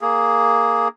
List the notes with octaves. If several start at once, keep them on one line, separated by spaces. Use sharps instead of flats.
A#3 G#4